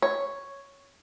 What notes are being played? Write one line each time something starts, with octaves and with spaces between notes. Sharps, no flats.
C#5